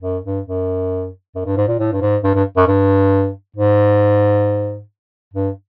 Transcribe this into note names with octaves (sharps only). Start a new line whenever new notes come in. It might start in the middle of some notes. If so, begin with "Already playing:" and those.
F#2
G2
F#2
F#2
G2
G#2
A#2
A2
G2
G#2
G2
G2
F#2
G2
G#2
G2